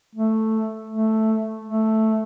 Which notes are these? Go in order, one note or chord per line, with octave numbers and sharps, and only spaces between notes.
A3
A3
A3